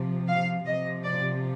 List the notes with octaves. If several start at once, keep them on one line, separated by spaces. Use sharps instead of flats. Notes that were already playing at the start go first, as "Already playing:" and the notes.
Already playing: C3 F3
F5
C3 F3 D#5
D5